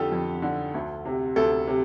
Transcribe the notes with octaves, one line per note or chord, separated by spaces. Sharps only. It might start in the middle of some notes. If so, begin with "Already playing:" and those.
Already playing: F2 D3 F4 G4 A4
F2
D3
D2
C3
D2 A4
C3